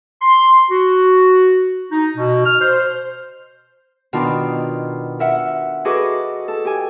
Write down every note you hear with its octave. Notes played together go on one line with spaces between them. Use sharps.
C6
F#4
D#4
B2
F6
C5
B2 D#3 D4 F4
A#4 E5 F#5
F#4 G#4 A4 B4 D#5 D6
A4
G4 G#5